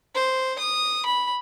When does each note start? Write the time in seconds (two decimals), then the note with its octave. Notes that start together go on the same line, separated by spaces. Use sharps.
0.15 C5
0.59 D#6
1.05 B5